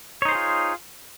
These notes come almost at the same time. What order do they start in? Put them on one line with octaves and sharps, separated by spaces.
C#5 D#4 C5 G#4 F4